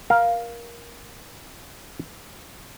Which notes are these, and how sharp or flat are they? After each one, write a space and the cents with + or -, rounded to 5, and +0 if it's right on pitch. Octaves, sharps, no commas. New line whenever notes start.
A#4 +20 F5 +0